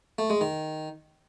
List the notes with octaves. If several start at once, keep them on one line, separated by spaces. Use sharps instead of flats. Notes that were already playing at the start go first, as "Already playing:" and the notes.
A3
G#3
D#3